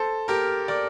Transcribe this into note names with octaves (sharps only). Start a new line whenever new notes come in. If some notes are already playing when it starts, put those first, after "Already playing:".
Already playing: A4 C5
G4 A#4
A#4 D5